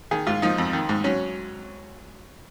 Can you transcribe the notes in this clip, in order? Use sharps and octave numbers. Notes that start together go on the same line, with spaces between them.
D#3 G#4
G#2 F4
F3 D#4
F2
D#3
G#2
F#3 C#4